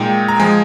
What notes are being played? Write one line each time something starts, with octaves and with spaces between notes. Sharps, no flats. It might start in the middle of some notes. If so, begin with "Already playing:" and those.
Already playing: A#2 G#3 D#4 G5
A#5
F3 G#3 G#5